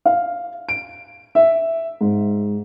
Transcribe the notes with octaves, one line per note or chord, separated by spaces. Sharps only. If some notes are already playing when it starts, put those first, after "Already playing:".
F5
D7
E5
G#2